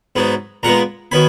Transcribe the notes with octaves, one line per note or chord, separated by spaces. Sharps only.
G#2 F#3 B3 D#4
A#2 G#3 B3 F#5 A#5
D#3 F#3 B3 G#5 B5